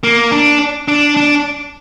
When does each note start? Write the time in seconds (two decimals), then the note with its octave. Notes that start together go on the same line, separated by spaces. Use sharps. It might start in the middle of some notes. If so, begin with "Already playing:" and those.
0.03 A#3
0.32 D4
0.88 D4
1.17 D4